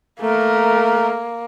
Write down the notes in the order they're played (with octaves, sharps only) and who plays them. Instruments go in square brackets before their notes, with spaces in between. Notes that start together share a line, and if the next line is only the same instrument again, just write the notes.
[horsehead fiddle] A3 A#4 [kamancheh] A#3